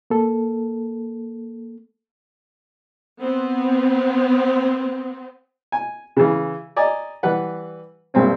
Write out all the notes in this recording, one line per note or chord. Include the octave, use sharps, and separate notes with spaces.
A#3 A4
B3 C4
G#5
C#3 E3
D5 D#5 G#5 A#5
E3 G3 B4 F#5
A#1 G2 A#2 C4 C#4